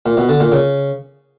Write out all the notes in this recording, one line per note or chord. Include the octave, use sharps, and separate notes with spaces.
A#2
B2
D3
A#2
C#3